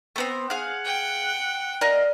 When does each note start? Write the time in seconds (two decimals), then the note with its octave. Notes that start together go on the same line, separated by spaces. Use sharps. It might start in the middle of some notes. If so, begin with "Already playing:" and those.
0.16 A3 B3 C4
0.50 G#4 F5 F#5
0.85 G5
1.81 A#4 D5 D#5 F5